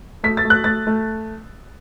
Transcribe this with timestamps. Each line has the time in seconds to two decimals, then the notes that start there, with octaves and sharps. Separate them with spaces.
0.24 A3 B6
0.37 A6
0.45 A3
0.50 F#6
0.64 A3 A6
0.87 A3